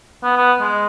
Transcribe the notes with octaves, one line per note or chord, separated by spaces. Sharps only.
B3
B3
G#3